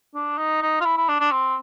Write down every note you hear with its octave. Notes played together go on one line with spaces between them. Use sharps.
D4
D#4
D#4
F4
E4
E4
D4
D4
C4